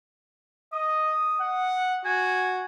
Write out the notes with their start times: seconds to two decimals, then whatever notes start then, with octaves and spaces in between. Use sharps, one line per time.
0.73 D#5 D#6
1.41 F#5
2.05 F#4 G#5